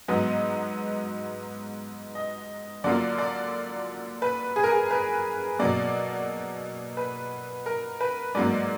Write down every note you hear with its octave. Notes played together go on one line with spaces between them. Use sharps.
G#2 F#3 B3 D#4
D#5
D3 F#3 A#3 F4 D5
D5
B4
G#4
A#4
G#4
B4
B2 F#3 A#3 D5
B4
A#4
B4
G#2 F#3 A#3 D5